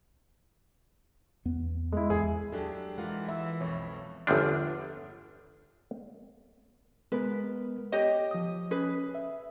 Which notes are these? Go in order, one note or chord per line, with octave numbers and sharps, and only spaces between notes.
E2 B3
G#3 E4
E2 G#4
F#3 D4 G4 A4
E3 G#3 F4 A#4 F#5
E5
B1 F2 C#5
G1 E2 F3 D4
G#3 B3 A#4 B4
G4 C#5 D#5
F3 D#6
C#4 G#4 B4
E5